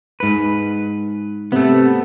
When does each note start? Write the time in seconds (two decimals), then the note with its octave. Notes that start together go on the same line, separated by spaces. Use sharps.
0.20 G#2 B4
1.52 C3 A3 B3